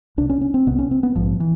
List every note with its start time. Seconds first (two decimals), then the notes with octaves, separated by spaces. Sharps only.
0.17 C2 C3 D4
0.29 C#4
0.41 C#4
0.54 C4
0.67 C2 C3 B3
0.79 C#4
0.91 C4
1.03 B3
1.15 A#1 G#2 F3
1.40 E3